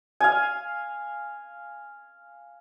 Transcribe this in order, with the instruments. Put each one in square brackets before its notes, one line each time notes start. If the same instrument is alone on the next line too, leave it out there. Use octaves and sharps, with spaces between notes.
[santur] F5 G#5